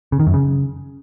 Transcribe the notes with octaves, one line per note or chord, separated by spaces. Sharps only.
C#3
D#3
F#2
C#3